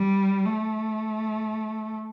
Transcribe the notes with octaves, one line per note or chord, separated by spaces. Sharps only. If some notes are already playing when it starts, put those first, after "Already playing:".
Already playing: G3
A3